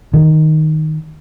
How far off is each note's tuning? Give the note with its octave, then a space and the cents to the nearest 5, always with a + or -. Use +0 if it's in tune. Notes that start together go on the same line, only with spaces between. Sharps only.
D#3 +0